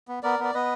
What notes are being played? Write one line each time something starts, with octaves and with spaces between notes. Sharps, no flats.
B3
B3 A#4 D5
B3 D5
B3 B4 D#5